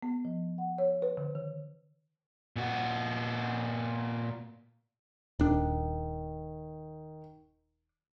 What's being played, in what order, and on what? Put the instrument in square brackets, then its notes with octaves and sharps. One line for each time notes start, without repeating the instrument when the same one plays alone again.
[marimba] B3
F3
F#5
C#5
B4
D3
D#3
[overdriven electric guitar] A#2 F#4
[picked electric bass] D#1 D4 [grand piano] D#3